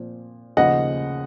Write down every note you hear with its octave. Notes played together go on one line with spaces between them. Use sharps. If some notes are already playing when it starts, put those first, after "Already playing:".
Already playing: A#2 F3 C4
D#2 C#3 F3 D#5 F#5